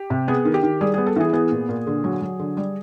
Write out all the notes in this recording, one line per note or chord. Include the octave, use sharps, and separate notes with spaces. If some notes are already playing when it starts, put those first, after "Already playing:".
Already playing: G4
C3
B3 G#4
D#3
G4
D#3
G3 G#4
B3 G#4
A4
E3 G#4
B3 G#4
A#2
A#2
D3
F#3
F#3
D3
G3